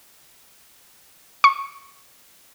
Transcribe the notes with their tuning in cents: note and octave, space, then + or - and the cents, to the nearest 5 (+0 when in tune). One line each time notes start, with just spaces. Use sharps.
C#6 -10